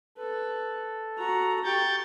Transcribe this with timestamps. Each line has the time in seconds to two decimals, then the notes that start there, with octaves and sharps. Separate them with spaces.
0.18 A4 B4
1.18 F#4 A#5
1.64 G4 G5 C#6 G6 A6